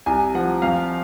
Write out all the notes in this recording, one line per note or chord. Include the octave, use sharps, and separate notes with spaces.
C2 G#5
F3 F#5
F2 F5